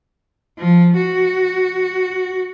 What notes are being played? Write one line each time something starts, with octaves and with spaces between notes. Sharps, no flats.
F3
F#4